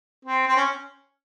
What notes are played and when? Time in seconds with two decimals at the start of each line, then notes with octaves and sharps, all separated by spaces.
0.25 C4
0.48 C4
0.56 C#4